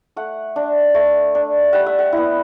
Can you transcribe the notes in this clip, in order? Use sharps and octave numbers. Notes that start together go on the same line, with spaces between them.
A3 F#5
D4
A3
D4
G3 F#5
E5
F#5
B3 E4